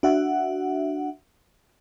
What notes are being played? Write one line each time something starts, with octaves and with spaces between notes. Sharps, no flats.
D4 F#4 E5 F#5